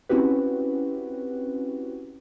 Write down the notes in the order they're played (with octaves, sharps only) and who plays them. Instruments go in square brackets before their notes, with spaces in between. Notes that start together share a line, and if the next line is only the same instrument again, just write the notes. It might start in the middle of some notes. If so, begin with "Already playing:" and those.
[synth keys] C4 C#4 E4 F#4 G4 B4